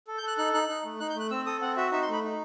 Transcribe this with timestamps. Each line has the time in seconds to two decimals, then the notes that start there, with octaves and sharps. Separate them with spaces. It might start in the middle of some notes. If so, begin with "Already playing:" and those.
0.08 A4
0.18 G6
0.23 A4 F#6
0.38 D#4 F#6
0.54 D#4 F#6
0.69 D#4
0.84 A3
1.00 D#4 F#6
1.10 G6
1.15 A3 F#6
1.30 C4 E6
1.46 A4 D#6
1.62 C4 F#5
1.77 F#4 E5
1.92 D#4 E5
2.02 C6
2.08 A3 B5
2.23 D#4